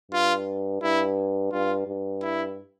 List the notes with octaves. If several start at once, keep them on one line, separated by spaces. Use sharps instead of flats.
G2 F4
G2 E4
G2 F4
G2
E4